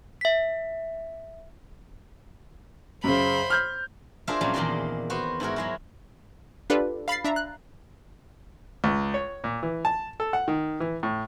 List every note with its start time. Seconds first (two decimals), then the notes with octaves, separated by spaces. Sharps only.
0.21 E5 B6
3.04 F#2 C#3 C5 B5
3.50 F6 G6
4.27 D4 F4 G#4 A#4 C5 E5
4.41 F2 A#2 F#3 G3 C#4
4.54 E2 A#2 D#3 A#3 D5 C6
5.10 B3 F#4 C5
5.40 G#2 E4 F#4 A#4
5.56 F#3 G#3 E4
6.70 D4 F4 G4 A4 B4 D5
7.08 F5 B5 A6 C7
7.25 D4 E5 A#5
7.36 F#6
8.84 C#2
9.14 C#5
9.44 A#2
9.63 E3
9.85 A5
10.20 A4
10.33 F#5
10.48 D#3
10.80 E3
11.03 A2